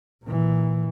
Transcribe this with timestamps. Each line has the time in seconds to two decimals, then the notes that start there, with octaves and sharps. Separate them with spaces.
0.24 A#2 E3